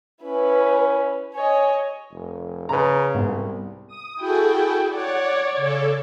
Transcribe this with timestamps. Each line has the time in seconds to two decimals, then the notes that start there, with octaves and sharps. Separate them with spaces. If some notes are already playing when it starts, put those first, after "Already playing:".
0.23 C#4 E4 B4
1.35 C#5 D#5 G#5
2.12 F1
2.69 C#3 B4 A#5
3.15 C2 G#2 B3
3.87 D#6
4.19 E4 F#4 G#4 A4 G5
4.92 C#5 D5 F#5
5.56 C#3 A4